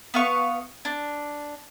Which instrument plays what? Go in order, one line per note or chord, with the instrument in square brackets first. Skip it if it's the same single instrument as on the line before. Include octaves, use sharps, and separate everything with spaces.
[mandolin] B3 F5 C#6
D4